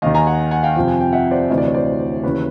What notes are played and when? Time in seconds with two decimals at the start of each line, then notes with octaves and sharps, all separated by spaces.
0.02 D#2 D#3 D#5 F5
0.14 G#5 A#5
0.26 F#5 G#5
0.51 F#5 G#5
0.63 F5 G5
0.76 F2 C3 F3
0.88 G#5
1.01 G5
1.13 E5 F#5
1.31 C5 D5
1.49 D2 C3 E3 D#5
1.58 D5
1.66 C#5
1.74 C5 D5
2.23 D#2 C#3 E3 B4 C#5